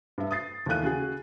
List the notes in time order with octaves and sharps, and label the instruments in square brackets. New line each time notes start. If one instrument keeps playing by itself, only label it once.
[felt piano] G2 E5
D#6 A6 C7
D#2 E3 A3 F5 F#6 D#7
C#3 F#4 G#4